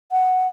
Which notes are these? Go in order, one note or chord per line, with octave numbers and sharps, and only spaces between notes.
F#5